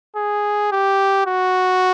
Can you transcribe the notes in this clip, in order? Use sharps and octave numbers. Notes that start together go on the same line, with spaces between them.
G#4
G4
F#4